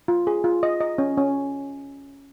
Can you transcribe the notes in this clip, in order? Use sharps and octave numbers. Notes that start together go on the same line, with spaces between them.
F4
G#4
F4
D#5
D#5
C#4
C#4